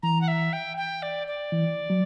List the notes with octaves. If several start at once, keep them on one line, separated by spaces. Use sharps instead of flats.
E3 A#5
F#5
E5
G5
G5
D5
D5
E3
F#3